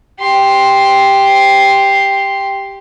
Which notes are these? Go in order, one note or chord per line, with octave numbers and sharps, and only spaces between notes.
G4 C6